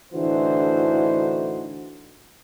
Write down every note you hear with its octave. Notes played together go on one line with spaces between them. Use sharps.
A2 D3 E3 D#4 F#4 C5